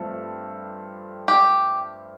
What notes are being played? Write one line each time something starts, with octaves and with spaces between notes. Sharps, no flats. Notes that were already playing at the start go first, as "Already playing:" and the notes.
Already playing: G2 F3 A3 C4 A4
G4